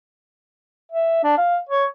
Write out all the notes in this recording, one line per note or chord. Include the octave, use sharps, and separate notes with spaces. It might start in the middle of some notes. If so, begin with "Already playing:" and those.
E5
D4
F5
C#5